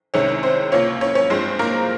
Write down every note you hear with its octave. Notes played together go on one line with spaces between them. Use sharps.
C2 C3 D#3 G#3 C#4
C4 C5
C#2 C3 F3 A#3 C#4 C#5
C#4 C#5
C#4 C#5
G2 F3 G#3 C4 C5
A#3 A#4